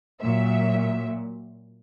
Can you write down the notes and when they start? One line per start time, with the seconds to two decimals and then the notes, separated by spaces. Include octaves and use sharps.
0.22 A#2 F#3 E5